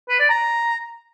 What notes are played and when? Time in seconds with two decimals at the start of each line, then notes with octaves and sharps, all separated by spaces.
0.09 B4
0.19 D5
0.30 A#5